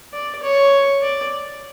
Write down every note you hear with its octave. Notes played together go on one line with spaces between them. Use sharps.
D5
C#5
D5